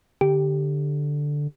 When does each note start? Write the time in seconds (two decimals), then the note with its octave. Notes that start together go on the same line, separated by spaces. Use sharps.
0.21 D3 G4